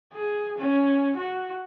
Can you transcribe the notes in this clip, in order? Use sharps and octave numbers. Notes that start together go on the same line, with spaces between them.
G#4
C#4
F#4